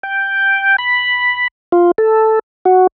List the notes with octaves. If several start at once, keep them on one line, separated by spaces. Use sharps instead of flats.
G5
B5
F4
A4
F#4